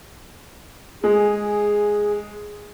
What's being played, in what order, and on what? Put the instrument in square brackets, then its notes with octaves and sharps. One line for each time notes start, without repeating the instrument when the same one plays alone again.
[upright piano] G#3 [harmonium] G#4